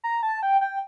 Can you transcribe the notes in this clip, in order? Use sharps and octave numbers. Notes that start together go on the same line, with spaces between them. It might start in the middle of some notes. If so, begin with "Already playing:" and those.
A#5
A5
G5
G5